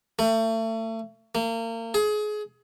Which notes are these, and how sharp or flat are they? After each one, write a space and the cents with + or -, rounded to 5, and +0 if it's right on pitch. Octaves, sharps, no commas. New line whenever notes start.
A3 +35
A#3 -35
G#4 +25